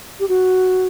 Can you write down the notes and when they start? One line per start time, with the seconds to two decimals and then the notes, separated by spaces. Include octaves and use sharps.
0.20 G4
0.29 F#4